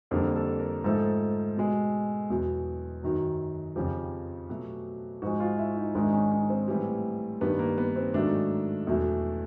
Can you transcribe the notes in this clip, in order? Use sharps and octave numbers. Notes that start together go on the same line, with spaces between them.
F2 D3 G3 A#3 A4
A4
A#4
G#2 F3 A3 A4
B2 G#3
E2 B2 F#3
F#2 D#3 F#3
F2 C#3 F3 G4
B2 F#3 A3
G#2 F3 G#3 F#4
F4
E4
D#4
G#2 D#3 G#3 D4
C#4
C#4
C4
A2 E3 G3
G2 D#3 G3 B3
A#3
B3
C4
G#2 D#3 F#3 A3 D4
E2 B2 F#3 A3